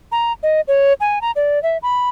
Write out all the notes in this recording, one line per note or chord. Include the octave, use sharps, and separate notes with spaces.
A#5
D#5
C#5
G#5
A#5
D5
E5
B5